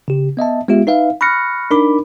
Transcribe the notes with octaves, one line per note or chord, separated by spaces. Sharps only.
C#3 G4
B3 D#5 E5 A5
G#3 B3 F4 G4 E5
D#4 B4 E5 F5
B5 C#6 F6 F#6 A#6 C#7
D4 D#4 A#4 B5 D6